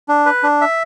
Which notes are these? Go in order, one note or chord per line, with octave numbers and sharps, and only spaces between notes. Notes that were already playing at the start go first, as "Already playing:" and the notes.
D4
B4
D4
E5